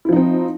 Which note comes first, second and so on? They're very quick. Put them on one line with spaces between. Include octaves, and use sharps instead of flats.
E4 F3 D#4 C4